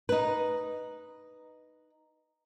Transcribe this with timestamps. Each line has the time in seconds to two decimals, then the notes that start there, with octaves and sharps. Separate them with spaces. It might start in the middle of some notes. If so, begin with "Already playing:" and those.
0.09 D#4 B4